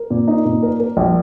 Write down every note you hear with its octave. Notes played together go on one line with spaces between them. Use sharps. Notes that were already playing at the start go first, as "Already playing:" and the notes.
Already playing: A#4
A#2
D#4
A#2
A#4
A#4
A#1